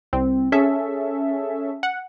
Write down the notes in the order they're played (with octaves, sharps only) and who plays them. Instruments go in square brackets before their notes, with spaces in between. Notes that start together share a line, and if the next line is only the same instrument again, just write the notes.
[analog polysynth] C2 C4
C#4 G#4 A4 E5
F#5